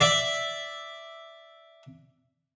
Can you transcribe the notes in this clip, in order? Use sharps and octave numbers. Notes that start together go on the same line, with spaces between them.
D5 E5